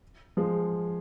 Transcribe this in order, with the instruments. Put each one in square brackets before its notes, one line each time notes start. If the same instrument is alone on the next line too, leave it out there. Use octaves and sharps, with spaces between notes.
[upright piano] F3 G#3